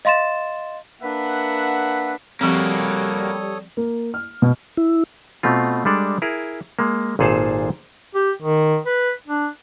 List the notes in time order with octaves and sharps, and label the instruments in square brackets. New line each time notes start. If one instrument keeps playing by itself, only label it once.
[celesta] D#5 F5 C6 A6 E7
[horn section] A#3 D4 B4 E5 F#5
[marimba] F3 C4 [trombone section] G3 [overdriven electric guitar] A#3 F#4 [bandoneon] A4 C#5 D#6
[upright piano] A#3
F6
B2
[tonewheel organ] E4
[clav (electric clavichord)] B2 A3 C4 F4
G3 G#3 D4 A4 D5
E4 G#4 A#4
G#3 A#3
G#1 A#2 G#4 A4 C5 A5
[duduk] G4
D#3
B4
D4